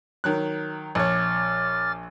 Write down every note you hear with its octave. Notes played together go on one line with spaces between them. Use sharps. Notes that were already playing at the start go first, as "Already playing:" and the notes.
D#3 F#3 F#6
A#1 C#5 D6 F6 A6